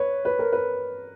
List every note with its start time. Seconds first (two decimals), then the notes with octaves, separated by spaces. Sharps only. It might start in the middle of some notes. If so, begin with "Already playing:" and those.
Already playing: B4 C#5
0.25 B4
0.39 A#4
0.53 B4